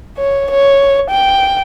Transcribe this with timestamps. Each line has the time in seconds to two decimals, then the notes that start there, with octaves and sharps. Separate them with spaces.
0.17 C#5
0.51 C#5
1.10 G5